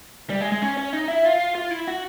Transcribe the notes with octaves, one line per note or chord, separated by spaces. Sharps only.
G3
G#3
G#3
C#4
C#4
D#4
E4
F4
F4
E4
F#4